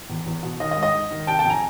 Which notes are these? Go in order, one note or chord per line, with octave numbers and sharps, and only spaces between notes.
E2
E2
B2
D#3 D#5
D#5
G#2
D#5
G#2
D#3
C3 G5 A5
G5 A5
F2
G#5 A#5